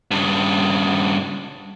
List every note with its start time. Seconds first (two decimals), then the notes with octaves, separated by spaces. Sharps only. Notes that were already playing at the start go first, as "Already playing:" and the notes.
0.11 G2 C#3